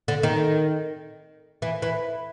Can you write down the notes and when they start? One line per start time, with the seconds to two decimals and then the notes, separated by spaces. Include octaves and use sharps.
0.08 D3
0.23 D#3
1.62 E3
1.82 E3